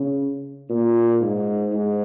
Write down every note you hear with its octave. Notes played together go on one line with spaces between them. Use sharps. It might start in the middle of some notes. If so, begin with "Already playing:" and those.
Already playing: C#3
A#2
G#2
G#2